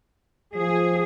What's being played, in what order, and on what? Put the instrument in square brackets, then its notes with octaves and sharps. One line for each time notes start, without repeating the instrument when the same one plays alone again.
[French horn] F3 [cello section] G#4